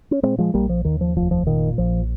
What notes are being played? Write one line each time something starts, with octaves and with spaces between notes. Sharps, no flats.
C#4
A#2 G#3 C4
F3 G#3
A#1 G3 A#3
F3
D#2 D#3
F3
F1 F3
F3
A#2 D#3
A#1 F3